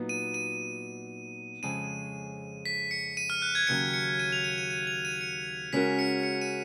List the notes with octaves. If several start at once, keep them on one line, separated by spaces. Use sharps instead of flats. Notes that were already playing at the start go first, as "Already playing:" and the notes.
Already playing: A#2 F#3 B3 D#4
D#7
D#7
F2 C#3 G#3 D#7
B6
C#7
D#7
F6
F#6
G#6
D#2 C#3 F#3 C#7
C#7
D#7
F7
D#7
D#7
D#7
F7
D#7
C#7
C#3 G#3 C#4 F#4 A#4 B6
C#7
C#7
D#7